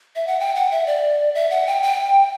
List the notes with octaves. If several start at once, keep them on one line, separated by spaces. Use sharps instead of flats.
E5
F#5
G5
F#5
E5
D5
E5
F#5
G5
G5